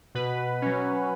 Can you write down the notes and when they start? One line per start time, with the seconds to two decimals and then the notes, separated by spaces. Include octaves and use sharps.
0.15 B2 B4
0.62 F#3 C#4